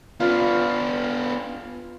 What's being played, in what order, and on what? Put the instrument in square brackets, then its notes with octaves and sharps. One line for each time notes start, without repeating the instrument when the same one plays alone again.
[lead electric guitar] B3 D4 [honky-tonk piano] F4